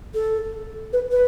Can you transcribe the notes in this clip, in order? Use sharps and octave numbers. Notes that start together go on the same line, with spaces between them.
A4
B4
B4